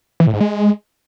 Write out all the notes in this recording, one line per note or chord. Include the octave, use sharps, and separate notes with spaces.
E3
A2
G#2
G#3